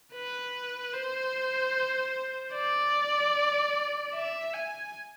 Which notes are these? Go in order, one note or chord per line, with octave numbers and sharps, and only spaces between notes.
B4
C5
D5
E5
G#5